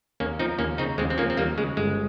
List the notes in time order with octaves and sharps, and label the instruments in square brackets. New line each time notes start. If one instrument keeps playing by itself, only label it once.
[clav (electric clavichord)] D#2 A#3 C#4
F3 C4 D#4
D#2 A#3 C#4
C#3 C4 D#4
D#2 G#3 C4
C4
F3 A#3 C#4
C4
D#2 G3 A#3
C#3 G#3
G1 G#3